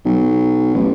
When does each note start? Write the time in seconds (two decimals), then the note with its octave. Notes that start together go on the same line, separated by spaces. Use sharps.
0.05 B1
0.74 A1